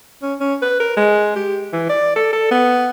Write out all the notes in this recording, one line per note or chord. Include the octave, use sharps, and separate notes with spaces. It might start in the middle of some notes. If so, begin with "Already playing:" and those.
C#4
C#4
B4
A#4
G#3
G4
E3
D5
A4
A4
B3